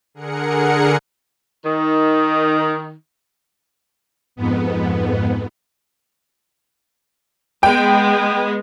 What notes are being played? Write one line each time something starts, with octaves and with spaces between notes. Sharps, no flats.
D3 G#4 A#4 F#5 C#7
D#3
F2 G#2 B3
G#3 B3 G5